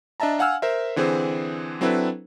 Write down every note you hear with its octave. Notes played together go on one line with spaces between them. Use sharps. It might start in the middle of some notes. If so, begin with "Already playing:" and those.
D4 D#5 E5 A5 A#5
F5 F#5 G#5 E6 F6
A#4 C5 E5
D3 E3 C4 G#4 C5
F#3 C4 D4 E4 A4 B4